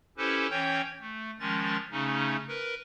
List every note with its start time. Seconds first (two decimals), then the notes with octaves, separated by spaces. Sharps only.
0.17 C#4 E4 G4 A4 B4 C5
0.50 E3 C#4 C#5 G5 G6
1.00 A3
1.40 D#3 F3 G#3 C#4 A6
1.91 C#3 A3 C#4 D#4
2.48 A#4 B4